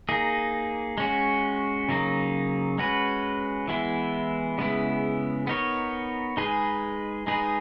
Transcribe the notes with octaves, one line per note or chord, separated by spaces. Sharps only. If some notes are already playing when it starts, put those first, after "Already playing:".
A#3 D#4 G#4
G#3 C#4 F#4
C#3 F#3 A#3 D#4
G#3 C#4 F#4 B4
E3 G#3 B3 E4
C#3 G#3 B3 E4
B3 D#4 A#4 C#5
G#3 D#4 G#4 B4
G#3 D#4 G#4 B4